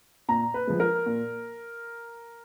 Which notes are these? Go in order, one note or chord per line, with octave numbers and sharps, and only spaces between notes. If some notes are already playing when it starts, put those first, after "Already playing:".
A#2 A#5
B4
F3 G#3
A#4
A#2